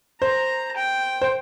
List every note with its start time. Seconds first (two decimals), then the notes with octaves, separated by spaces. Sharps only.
0.21 C5 A#5
0.76 G5
1.22 C5